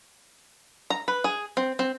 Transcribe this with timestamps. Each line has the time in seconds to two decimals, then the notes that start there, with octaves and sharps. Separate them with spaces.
0.90 A#5
1.08 B4
1.24 G#4
1.57 C4
1.79 C4